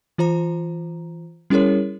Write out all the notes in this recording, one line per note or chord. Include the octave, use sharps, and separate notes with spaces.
E3 F4 C5 A#5
G3 C#4 E4 G#4 A#4 C#5